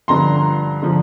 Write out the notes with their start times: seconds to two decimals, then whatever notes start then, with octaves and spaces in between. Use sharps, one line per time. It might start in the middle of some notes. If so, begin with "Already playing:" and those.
0.08 G2 D3 F3 A#5 C6
0.82 D3 F3